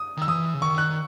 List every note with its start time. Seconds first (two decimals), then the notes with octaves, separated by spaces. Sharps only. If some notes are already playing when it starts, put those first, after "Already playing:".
Already playing: D#6
0.17 D#3 E6
0.28 E3 D#6
0.54 C#3
0.62 D#3 C#6
0.78 F#6
0.90 D#3